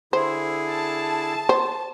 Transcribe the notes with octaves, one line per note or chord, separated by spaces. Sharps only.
D3 E4 G#4 C5
A5
C5